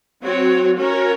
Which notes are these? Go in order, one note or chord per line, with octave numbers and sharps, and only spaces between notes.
F#3 C4 F#4 C#5
C#4 F#4 A#4 C#5